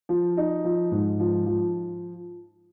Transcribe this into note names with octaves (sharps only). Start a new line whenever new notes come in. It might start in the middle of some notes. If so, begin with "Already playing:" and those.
F3
D#4
F3
G#2
F3
F3